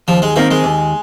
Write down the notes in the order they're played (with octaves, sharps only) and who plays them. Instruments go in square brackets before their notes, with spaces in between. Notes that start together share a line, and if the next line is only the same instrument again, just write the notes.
[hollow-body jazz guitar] D#2 [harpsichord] F3
[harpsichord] G#3
[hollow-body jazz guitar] D#3 C4 D#4 A#4 [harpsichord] A#3
[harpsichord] G#3
[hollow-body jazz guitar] D#2